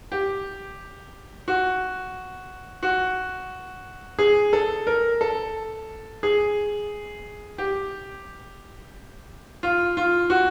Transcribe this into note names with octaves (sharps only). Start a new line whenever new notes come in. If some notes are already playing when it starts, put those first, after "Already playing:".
G4
F#4
F#4
G#4
A4
A#4
A4
G#4
G4
F4
F4
F#4